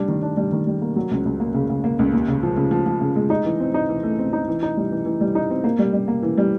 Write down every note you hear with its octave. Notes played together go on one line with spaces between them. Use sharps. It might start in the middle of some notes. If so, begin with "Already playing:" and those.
Already playing: G3 D4
D#3
D4
G3
D#3
G3
A#3
F#3
C#2
C#2
A#3
C#3
C#3
A#3
C#2
D#2
C#3
F3
C#3
F3
F3
C#3
G#3
D#4
E3
C4
D#4
E3
A3
C4
D#4
E3
D#4
G3
E3
E3
G3
D#4
C4
A#3
G3
G3
A#3
E3
G3